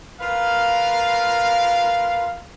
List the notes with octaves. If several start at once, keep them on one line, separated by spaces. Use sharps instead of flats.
F4 A#4 B4 F5